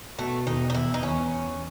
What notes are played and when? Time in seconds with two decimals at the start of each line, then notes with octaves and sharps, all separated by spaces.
0.18 B2 A3
0.47 E1 D#4
0.70 D#4
0.74 E2 E4
0.94 D#4
1.02 E2 C#4